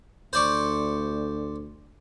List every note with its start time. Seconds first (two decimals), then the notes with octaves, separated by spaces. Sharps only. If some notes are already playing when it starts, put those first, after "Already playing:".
0.33 D2 C5 D5 C#6